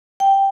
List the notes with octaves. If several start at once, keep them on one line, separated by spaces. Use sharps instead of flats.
G5